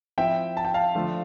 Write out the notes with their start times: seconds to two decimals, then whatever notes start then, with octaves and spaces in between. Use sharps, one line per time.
0.18 F3 C4 E4 E5 G5
0.57 A5
0.65 G5
0.74 F5 A5
0.95 D3 F3 A3 D4 F4